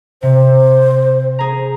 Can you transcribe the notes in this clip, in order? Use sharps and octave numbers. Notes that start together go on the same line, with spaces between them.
C3 C5
G#4 A#5